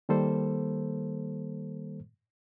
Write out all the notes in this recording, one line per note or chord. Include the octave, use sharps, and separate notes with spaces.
D#3 G3 A#3 A4 C5